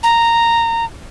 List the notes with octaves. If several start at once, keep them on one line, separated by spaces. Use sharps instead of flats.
A#5